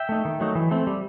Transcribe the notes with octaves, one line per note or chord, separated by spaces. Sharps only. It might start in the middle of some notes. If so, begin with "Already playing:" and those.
Already playing: E5 G5
A3 D#4
D#3
F#3 A3 D#4
E3
A3 C4
G3